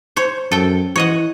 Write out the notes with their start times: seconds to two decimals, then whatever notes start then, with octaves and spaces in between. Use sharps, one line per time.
0.16 C5 C#5
0.51 F#2 A4 G5
0.96 E3 C#5 D#5 F#5